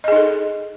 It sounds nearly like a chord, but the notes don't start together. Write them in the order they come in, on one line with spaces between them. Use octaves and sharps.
D#5 G#4 D#4 A4